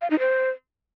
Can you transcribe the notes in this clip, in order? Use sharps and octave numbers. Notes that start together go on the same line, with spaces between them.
F5
D#4
C5